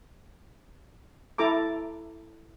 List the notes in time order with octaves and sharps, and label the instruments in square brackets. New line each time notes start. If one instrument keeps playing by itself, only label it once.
[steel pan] E4 A4 A#5 D6